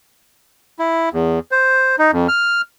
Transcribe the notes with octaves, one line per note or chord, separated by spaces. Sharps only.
E4
E2
C5
D#4
F2
F6